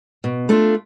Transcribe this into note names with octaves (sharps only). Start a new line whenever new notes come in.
B2
A3 D4 F4